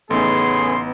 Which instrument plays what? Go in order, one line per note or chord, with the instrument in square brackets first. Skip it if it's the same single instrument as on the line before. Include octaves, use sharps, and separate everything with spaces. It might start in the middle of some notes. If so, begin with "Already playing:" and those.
[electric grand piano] A1 D#4 [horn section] C#3 A3 G#4 [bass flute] B3 [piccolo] C6